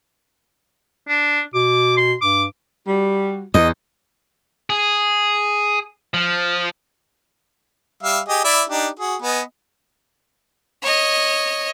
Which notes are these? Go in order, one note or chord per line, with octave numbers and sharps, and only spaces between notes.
D4
B2 D6
C6
G2 D6
G3 F#4
E2 D#5
G#4
F3
G3 E5 F5
G4 G#4 D#5
E4 D5 E5
D4 D#4 G4
F#4 G#4
B3 D#5 G#5
C#5 D#5